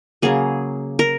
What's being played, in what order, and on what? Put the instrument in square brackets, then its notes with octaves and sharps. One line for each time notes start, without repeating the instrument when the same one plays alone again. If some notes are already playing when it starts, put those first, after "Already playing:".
[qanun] C#3 F#3 A#3 G#4
A#4